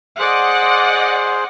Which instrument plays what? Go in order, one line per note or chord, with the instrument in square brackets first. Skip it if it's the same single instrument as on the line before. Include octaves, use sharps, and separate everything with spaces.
[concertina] G#4 C5 C6 [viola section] D5 D#5 F#5